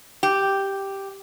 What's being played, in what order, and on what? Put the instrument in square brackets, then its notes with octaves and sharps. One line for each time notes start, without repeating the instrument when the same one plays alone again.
[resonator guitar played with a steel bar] G4